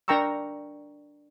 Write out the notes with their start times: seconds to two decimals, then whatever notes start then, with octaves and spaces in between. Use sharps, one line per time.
0.08 D4 A#4 G5 A#5 C#6 E6